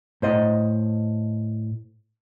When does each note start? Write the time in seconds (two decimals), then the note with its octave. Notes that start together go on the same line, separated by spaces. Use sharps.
0.22 A2 C5 D#5